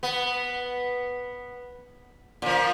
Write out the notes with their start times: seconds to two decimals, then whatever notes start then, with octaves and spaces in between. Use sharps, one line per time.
0.03 B3
2.42 A#2 F3